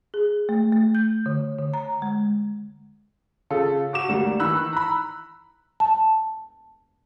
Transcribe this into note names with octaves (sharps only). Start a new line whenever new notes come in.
G#4
A3
A3
G6
D3
D3
A#5
G#3
C#3 F4 A4
F#4 D6 E7
D2 G3 A#3
D#3 E3 B5 E6 F#6
A#5 B5
A5